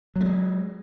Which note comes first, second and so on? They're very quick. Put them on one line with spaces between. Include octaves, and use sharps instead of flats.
F#3 A3 G#3